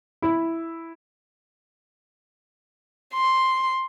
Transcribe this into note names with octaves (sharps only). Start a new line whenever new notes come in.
E4
C6